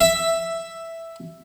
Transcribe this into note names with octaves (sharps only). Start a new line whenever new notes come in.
E5